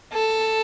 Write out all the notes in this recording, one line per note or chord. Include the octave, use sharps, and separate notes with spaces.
A4